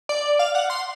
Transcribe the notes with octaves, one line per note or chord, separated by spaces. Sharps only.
D5
F5
F#5
C6